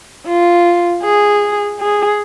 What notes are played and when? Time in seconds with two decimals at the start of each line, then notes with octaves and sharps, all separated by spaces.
0.27 F4
1.03 G#4
1.80 G#4